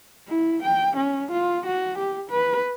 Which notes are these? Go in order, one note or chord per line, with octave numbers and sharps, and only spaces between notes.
E4
G5
C#4
F4
F#4
G4
B4